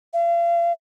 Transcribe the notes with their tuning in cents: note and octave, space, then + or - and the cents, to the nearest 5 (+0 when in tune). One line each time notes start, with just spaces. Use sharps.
F5 -40